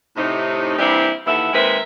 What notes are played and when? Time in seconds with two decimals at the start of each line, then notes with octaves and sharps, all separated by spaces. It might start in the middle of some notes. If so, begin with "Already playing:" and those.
0.17 A2 C3 D#4
0.78 E3 G3 A#3 C4 D4 E4
1.27 D#2 E3 E4 A4 E5 F#5
1.53 D#2 G#3 C4 A#4 B4 E5